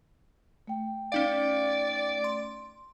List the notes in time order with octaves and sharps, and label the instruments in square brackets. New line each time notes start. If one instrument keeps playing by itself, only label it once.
[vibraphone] A3 G5
[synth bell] C#4 D#4 F5 [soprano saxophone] D5
[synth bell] C6